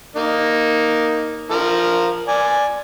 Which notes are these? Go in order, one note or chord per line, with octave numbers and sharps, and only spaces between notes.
A#3 D#4
F3 A#4
D5 G#5